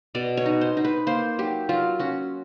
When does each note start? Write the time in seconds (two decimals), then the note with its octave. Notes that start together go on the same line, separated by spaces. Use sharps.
0.15 B2 D5
0.37 C#5
0.46 D#4
0.61 C5
0.77 D#4
0.85 B4
1.07 A#3 C5
1.38 F#3 G4
1.69 F#3 F4
1.99 C#4 F#4